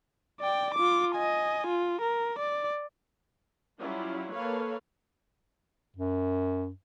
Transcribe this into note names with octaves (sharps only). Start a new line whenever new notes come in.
D5 G5
F4 D6
D#5 G#5
F4
A#4
D5
F#3 G3 C#4 E4 F4
A#3 A4 B4 C#5 F5
F#2